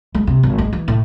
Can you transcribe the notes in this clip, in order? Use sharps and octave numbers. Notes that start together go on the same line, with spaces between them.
G#3
C3
G#1
G#3
E3
A2